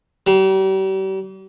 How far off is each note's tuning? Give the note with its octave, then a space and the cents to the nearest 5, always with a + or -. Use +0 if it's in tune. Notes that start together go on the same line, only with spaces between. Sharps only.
G3 -40